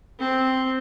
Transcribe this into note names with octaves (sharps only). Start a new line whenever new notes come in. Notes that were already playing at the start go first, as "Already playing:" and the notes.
C4